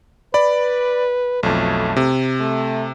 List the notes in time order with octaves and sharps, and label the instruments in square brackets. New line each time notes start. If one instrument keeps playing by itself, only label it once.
[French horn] B4 [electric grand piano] D5 B5
[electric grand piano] B1 F2 [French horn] A3
[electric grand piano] C3
[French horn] A3